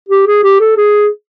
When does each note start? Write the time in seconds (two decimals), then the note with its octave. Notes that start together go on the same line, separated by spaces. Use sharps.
0.09 G4
0.27 G#4
0.43 G4
0.60 A4
0.77 G#4